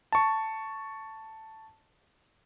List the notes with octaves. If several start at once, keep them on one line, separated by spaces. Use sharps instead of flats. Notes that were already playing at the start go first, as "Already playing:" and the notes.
A5 C#6